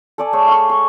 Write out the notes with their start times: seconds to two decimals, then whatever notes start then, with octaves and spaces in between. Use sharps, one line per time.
0.18 A4 D5 G#5
0.33 A3 G#4 C#5
0.47 F5 C#6
0.69 C#6